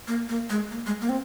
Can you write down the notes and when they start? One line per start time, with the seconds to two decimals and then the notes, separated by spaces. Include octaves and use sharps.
0.08 A#3
0.29 A#3
0.50 G#3
0.71 A#3
0.86 G#3
1.01 A#3
1.09 C4